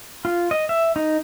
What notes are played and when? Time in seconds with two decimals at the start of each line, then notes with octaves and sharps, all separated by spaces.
0.25 F4
0.51 D#5
0.69 E5
0.96 D#4